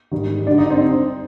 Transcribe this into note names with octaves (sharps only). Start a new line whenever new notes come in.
G#2 D#3 G3
G2 D3 G3 D4
D#4
C4